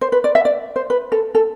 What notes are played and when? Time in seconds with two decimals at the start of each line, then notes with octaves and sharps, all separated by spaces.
0.01 C5
0.12 B4
0.24 D5
0.35 E5
0.45 D5
0.76 C5
0.90 B4
1.12 A4
1.35 A4